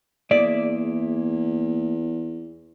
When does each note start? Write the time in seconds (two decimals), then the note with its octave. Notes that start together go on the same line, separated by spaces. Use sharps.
0.31 E2 A#3 G#4 D5 E5